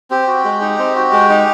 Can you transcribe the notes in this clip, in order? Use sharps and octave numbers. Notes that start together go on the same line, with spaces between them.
C4 G4
F#4
G#3
D#4
C4
F#4
G#3
D#4